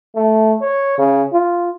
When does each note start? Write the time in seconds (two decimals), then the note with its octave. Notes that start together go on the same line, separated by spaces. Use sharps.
0.16 A3
0.61 C#5
0.98 C#3
1.33 F4